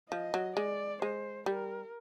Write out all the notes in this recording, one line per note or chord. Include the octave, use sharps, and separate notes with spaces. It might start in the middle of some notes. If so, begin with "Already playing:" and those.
F3 D#5
F#3
G#3 D5
G#3 C5
G3 A#4